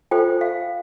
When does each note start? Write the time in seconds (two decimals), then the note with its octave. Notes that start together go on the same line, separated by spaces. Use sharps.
0.11 F4 A4 C5 G5
0.41 F5